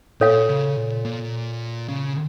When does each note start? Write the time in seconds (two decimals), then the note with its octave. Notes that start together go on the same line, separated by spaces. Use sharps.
0.21 A#2 A4 C#5 F5
0.49 C#3
0.77 A#2
1.05 A#2
1.88 C#3